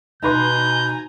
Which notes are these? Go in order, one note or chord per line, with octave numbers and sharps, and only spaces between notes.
B2 D#4 B4 G#5 A#5 C6 G6